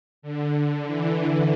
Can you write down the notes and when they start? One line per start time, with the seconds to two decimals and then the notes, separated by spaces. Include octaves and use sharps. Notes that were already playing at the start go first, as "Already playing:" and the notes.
0.22 D3
0.85 E3